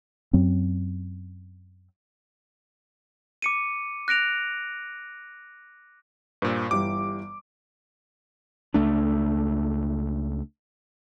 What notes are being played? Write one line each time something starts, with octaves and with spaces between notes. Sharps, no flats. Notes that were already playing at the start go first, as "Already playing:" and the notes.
F#2 F#3 C4
D6 C#7 D#7
F#6 A#6 D7 F7
G2 A#2 C5
G1 E3 G3 D6
C#2 A3 D4